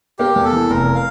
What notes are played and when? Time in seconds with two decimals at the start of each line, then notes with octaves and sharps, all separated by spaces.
0.19 A#3 G4
0.36 E2
0.44 A4
0.53 E3
0.70 F1 A#4
0.95 F5